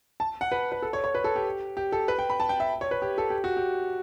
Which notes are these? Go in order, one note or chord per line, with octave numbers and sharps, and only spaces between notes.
A5
F#5
B4
B4
A4
C#5
C#5
B4
A4
G4
G4
A4
B4
G5
B5
A5
G5
E5
C#5
B4
G4
A4
G4
F#4
G4